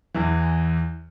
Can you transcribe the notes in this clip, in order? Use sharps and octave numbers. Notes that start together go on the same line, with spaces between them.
E2 E3